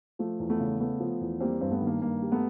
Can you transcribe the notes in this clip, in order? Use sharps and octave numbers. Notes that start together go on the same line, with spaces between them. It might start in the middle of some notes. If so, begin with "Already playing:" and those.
F3 A3
E2
A3 B3
C#3
A3 B3
F3
E2
G3 A#3 C4
G2 C4
A3 B3
D#3
A#3
G2 A#3
G3
A3 B3